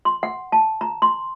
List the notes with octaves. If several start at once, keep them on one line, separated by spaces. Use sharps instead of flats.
C6
F#5
A5
A#5
C6